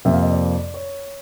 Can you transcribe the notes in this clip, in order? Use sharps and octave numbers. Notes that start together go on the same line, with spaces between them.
F2 C3 F3 A#3 E5
F5
D#5
D5
C#5